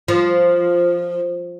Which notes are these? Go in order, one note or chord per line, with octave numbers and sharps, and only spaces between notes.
F3